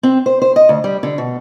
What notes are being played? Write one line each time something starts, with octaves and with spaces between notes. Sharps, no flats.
C4
C5
C5
D#5
D2
G3
D3
B2